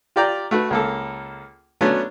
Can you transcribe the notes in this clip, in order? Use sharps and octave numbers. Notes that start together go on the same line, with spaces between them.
F4 G4 D5 G5 A#5
A3 F#4 B4
C#2 A#3 A4
F#3 A3 B3 C#4 D4